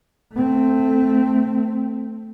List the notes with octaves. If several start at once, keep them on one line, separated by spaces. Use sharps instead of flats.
A3 C4